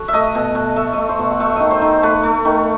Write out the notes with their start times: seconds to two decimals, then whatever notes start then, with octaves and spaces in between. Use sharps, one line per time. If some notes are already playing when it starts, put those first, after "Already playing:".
Already playing: F#4 A4
0.08 E5
0.13 A3 D#5
0.35 B2
0.55 B2
0.76 A3 E5
0.93 A3 D#5
1.09 C5
1.19 B2
1.31 F#5
1.40 A3 E5
1.56 D#3 D#5
1.71 C5
1.82 D#3
2.03 A3 B4
2.23 A3
2.45 D#3